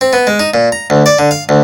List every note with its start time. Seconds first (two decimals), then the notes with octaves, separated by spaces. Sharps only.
0.01 C4
0.13 B3
0.27 G#3
0.40 D#4
0.54 A#2
0.72 A#5
0.90 D2
1.06 D5
1.19 D3
1.31 F5
1.49 D2